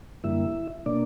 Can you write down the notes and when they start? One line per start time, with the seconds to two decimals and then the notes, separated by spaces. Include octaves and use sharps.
0.24 F#2 D3 G3 A#3 E4 E5
0.86 B2 A#3 D4 D5